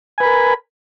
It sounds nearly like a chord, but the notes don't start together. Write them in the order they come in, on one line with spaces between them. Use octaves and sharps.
G#5 B4 B5 A#4